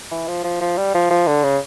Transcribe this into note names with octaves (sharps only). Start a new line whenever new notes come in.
E3
F3
F3
F3
G3
F3
F3
D3
C#3